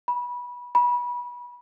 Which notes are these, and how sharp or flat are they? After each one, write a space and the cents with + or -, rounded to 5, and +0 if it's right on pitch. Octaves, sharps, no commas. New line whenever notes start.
B5 -20
B5 -25